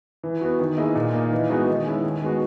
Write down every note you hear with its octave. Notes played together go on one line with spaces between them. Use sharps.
E3
B3 F#4
D#3
A#3 E4 G#4 D#5
A#2
A#3 D#4
E3
G#3 B3 D#4 F#4
D#3
G#3 C#4 E4
D#2
D#3 G#3 B3 F#4